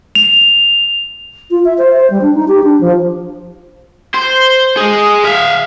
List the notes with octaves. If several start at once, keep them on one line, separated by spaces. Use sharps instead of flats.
F7
F4
E5
C5
C5
G3
D4
D#4
G4
D4
F3
C5
G#4 D#5
E5 F5